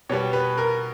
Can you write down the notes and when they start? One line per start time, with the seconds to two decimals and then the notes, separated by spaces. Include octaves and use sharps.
0.09 B2 G3 B3 C#5
0.33 B4
0.58 A#4